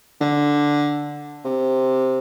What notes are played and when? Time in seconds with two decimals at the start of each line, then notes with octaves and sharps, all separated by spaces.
0.21 D3
1.45 C3